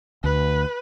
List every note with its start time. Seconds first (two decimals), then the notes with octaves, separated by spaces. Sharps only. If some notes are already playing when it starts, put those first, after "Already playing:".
0.24 D2 B4